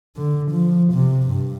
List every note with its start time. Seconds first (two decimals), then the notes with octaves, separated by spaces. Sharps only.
0.16 D3
0.52 F3
0.93 C3
1.28 G2